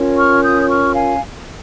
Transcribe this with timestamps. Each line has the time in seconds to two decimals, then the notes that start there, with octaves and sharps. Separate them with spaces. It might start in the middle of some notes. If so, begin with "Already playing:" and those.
Already playing: C#4 F4 A#4 C#5
0.17 C#6 F6
0.43 D#6 G6
0.61 D#6
0.68 C#6 F6
0.94 F5 G#5